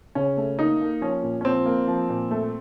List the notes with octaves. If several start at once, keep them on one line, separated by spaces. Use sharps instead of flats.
C#3 C#4
A3
A#3 D#4
A#3
F3 C#4
A#2
C#4
F3 C4
A#3
F3
A#2
A3